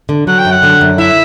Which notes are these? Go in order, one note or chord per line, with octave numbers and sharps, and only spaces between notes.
D3
F#3 F#5
G5
F#2
F#5
D3
F#2
E4 E5